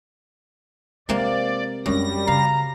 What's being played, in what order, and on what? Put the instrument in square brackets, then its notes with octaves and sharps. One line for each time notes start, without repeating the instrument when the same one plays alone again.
[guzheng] C3 A#3 [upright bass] G#3 [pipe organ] D5
[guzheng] F#2 [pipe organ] G3 A#6 [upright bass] G#3 D4
[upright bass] C#3 [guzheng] F5 [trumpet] A#5